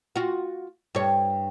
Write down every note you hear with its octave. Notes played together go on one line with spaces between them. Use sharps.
F4 F#4
G2 C#5